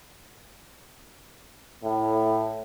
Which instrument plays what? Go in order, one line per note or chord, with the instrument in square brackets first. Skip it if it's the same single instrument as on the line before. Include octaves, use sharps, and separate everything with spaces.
[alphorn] A2